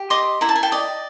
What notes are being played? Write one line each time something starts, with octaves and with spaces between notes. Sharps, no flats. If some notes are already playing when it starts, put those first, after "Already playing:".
Already playing: G4
D#5 C6 D6
E4 A#5
A5
G#5
G5 A5
D5 D#5